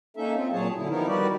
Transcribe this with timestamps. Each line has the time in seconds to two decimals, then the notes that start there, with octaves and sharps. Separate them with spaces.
0.17 A#3 C#4 D#4 A4 E5
0.35 C4 F4
0.52 A#2 F#3 G#4 C#5 A5
0.77 D3 F#3 E4
0.90 D#3 F3 B3 D#4 E4 A#4
1.07 D#3 G3 F#4 G4 B4 D5